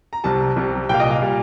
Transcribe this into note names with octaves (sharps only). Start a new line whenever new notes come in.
A#5
C2 C3 G3 A5
C2 C3 G3
C2 A#2 G3 F5 G5
D#5
F5
A#2 G3